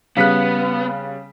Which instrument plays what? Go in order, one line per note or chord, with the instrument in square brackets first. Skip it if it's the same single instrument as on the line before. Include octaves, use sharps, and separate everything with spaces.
[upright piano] C#3 G3 B6 [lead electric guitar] B3 [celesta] F5 F#6